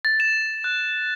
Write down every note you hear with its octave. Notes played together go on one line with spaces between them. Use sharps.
A6
E7
F#6